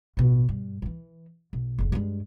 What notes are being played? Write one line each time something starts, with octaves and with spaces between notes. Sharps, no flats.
A1 B2
G2
D#3 E3
B1
F#1 D2
G2 G#3